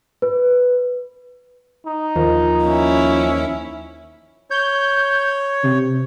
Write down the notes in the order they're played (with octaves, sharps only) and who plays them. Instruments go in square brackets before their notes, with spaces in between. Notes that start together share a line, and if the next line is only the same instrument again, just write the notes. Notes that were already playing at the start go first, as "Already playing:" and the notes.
[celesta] B4
[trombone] D#4
[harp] D#2 [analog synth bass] F3
[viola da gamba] C#4 E4
[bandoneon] C#5 [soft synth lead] G6
[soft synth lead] C3